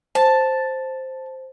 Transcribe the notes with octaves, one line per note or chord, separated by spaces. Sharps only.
C5 A5